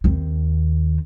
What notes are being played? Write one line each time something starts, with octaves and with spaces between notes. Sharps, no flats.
D#2 C4